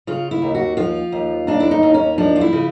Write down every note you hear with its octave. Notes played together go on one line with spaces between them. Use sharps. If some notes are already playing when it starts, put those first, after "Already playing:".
C#3 F4
E4
D#2
F#4
F3 F4
D#2
D#2 D4
E4
D#4
D#2
C#4
F3 D4
F4
E4
C#3